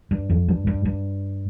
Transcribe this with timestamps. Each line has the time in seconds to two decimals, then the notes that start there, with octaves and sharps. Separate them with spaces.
0.11 G2
0.29 F2
0.48 G2
0.67 G2
0.85 G2